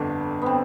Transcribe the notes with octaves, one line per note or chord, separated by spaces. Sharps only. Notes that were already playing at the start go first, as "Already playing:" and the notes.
Already playing: G1 F2 D3 D4
B3 C4